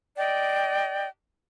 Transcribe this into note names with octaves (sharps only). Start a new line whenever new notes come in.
D5 D#5 G5